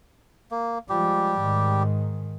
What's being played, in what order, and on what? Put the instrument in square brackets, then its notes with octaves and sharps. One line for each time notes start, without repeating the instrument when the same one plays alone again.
[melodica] A#3
[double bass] F3 G#3 [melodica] G3 G4
[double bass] G#2 D#3